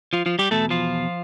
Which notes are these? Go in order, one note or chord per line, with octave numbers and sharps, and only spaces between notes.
F3 F4
F3 F4
G3 G4
E2 B2 A3 A4
F3 F4